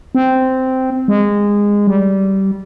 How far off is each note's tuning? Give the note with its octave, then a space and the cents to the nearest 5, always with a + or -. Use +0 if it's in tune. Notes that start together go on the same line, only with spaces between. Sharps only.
C4 -10
G#3 -20
G3 -20